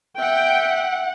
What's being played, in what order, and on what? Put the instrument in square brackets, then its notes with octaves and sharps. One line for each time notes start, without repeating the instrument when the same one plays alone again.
[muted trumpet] E5 [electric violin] F#5 [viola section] G5